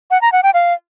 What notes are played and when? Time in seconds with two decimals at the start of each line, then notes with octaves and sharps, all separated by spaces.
0.11 F#5
0.22 A#5
0.32 F#5
0.43 G5
0.54 F5